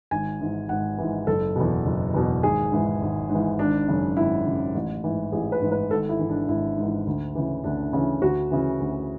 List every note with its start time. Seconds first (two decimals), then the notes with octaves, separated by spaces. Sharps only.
0.11 G#1 G#5
0.41 G#2 E3
0.69 G#1 F#5
0.98 G#2 E3
1.27 F#1 A4
1.56 E2 B2
1.86 F#1
2.14 E2 B2
2.43 G#1 G#4
2.72 G#2 E3
3.02 G#1
3.30 G#2 E3
3.59 G#1 D4
3.88 F#2 C#3
4.17 G#1 E4
4.46 F#2 C#3
4.75 A1
5.04 G#2 E3
5.32 A1 G#4
5.52 B4
5.62 G#2 E3
5.72 B4
5.90 G#1 A4
6.09 E4
6.19 G#2 E3
6.29 D4
6.48 G#1 E4
6.78 G#2 E3
7.07 D2
7.35 C#3 E3
7.64 D2 D4
7.93 C#3 E3
8.22 D2 F#4
8.51 C#3 E3
8.80 D2